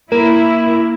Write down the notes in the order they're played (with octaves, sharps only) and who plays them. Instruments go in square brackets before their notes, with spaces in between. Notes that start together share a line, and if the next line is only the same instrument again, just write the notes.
[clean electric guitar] A#3 [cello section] E4 [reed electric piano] A#4